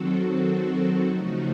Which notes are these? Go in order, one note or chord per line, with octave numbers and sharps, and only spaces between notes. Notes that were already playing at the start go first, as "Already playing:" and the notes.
Already playing: D#3 F#3 C4 F#4 A4
C#3 F3 A3 D#4 F#4